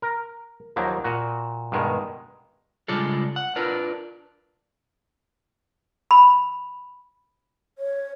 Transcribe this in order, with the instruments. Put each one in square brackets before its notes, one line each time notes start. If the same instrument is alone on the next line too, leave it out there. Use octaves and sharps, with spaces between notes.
[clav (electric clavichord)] A#4
D#2 F3 F#3 A#3
A#2 F#4
G2 B2 D#3 G#3
[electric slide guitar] C#3 G3 G#3 D4 F4 A4
F#5
D4 F4 A#4 B4
[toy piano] B5
[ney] C#5